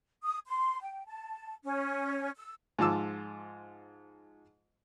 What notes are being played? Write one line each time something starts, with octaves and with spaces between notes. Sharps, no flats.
D#6
C6
G5
A5
C#4
E6
G#2 F3 F4 A5 D6 E6